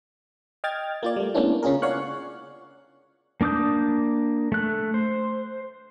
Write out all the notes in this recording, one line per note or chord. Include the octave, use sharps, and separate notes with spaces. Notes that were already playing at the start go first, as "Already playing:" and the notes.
D#5 G5 F6 G#6 A6
A#3 F4 D5
G3 A3
G#3 A#3 B3 C#4 D4 E4
C#3 C#4 F4 G#4 A#4
C#5 D5 F5 F#5 C#6 F#6
A#3 D4 D6 D#6 G6
A3 F#6
C5